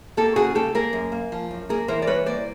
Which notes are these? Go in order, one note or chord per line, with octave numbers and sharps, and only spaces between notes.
A#3 G4 A4
C#3 F#4 G#4
A#3 G4 A4
A#3 G#4 A#4
F#2
A#3
F3
F#2
A#3 G#4 A#4
E3 A#4 C5
D5
G3 B4 C#5
A#3 C5 D5